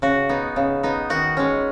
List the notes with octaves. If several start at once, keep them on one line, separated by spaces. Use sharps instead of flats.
C#3 F#4
B3 D#4
C#3
B3 D#4
D#3 F#4
G#3 C#4